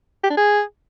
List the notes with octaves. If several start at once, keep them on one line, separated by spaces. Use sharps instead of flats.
G4
D4
G#4